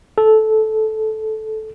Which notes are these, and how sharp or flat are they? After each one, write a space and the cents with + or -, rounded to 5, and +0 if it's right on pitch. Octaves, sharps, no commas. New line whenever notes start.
A4 -10